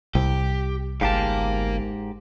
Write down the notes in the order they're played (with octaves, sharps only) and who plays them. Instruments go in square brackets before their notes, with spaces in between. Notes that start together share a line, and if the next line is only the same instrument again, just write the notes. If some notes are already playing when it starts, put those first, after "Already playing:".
[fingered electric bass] C2 [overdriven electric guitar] G4
[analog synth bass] G1 [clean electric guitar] G#2 G4 A5 [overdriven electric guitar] A#4 F5